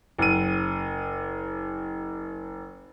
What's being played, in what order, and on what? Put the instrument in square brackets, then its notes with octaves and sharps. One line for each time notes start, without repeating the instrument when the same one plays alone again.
[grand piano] F#1 D#7